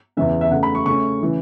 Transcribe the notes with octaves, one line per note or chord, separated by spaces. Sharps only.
E2 C#3 E3 C#4 E5
E5
C#3 A3 C#4 F#5
B5
C#6
C#3 A3 C#4 C#6
C#3 E3 C#4